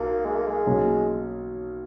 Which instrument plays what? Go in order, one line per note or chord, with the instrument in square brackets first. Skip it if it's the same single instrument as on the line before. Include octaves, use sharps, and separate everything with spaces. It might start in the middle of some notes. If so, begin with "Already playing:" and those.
Already playing: [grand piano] B1 [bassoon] A#3
[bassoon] G#3
A#3
G#3
[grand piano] B1 B2 F#3 A#3 C#4